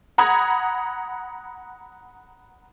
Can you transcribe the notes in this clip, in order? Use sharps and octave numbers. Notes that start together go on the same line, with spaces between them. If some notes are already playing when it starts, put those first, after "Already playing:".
F#5 A#5 B5 D#6 G#6